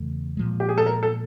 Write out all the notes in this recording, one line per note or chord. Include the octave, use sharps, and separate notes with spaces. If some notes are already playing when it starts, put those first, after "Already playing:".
Already playing: E2 C#3 E3 A3
A#2 F3 G#3
G4
G#4
A4
A#4
A4